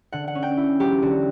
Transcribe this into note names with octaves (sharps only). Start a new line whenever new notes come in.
D3 F#5
F#5
C#4
G5
E4
F#3 G4
D3 F#4